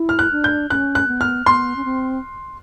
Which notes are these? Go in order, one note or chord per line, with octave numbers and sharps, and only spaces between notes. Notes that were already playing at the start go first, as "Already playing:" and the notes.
Already playing: E4
F6
F#6
D4
G6
C#4 F#6
F#6
B3
F6
B3 C6
C#4
C4